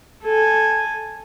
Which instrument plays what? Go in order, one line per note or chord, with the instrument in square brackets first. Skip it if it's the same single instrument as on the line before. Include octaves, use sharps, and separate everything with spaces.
[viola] A4 G#5